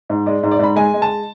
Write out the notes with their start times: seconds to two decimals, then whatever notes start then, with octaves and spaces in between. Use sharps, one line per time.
0.10 G#2
0.26 G#3 D5
0.43 G#2
0.51 D5
0.59 G#2 B5
0.76 G#3 G#5
0.94 G#3
1.02 A5